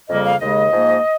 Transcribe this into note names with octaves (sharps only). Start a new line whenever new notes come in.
F2 C#3 G3 A#3 D#5
F5
D#2 C#3 G#3 D#5
G#2 F3 A#3